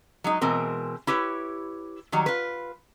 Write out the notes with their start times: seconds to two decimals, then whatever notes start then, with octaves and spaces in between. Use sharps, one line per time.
0.24 F#3 G#3 D#4
0.41 B2 E3 G#3 C4 A#4
1.07 E4 G4 B4 C#5
2.12 D#3 F#3 G3
2.26 F4 B4